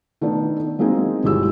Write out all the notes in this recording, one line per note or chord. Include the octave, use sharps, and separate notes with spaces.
D#3 A3 B3 D4
F#3 G#3 A#3 C4 D#4 G#4
G1 G#3 E4 F#4 G4 E6